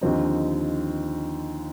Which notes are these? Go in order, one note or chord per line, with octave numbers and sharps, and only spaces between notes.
D#2 D3 F3 C4 D#4